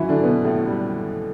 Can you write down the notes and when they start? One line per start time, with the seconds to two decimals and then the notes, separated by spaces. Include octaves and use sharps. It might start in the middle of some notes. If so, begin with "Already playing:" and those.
Already playing: E3 F#3 E4 F#4
0.09 D3 D4
0.24 B2 B3
0.45 A2 A3
0.66 G3